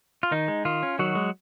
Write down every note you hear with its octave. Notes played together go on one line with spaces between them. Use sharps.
F4
D#3 D#4
G#3
D#3 F4
C#4
D#3 F#3 F#4
G#3